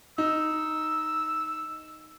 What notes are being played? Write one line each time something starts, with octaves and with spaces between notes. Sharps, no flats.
D#4 E6